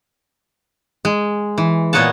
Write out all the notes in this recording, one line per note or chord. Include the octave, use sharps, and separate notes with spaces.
G#3
E3
A#2 B3 C#5 D#5 F#5 A5